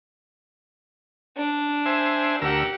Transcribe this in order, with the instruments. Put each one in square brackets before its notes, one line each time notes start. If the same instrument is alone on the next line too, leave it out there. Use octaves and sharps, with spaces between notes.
[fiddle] D4
[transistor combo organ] C5 E5 G#5
[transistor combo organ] D2 A#4 E6 [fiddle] G4 F#5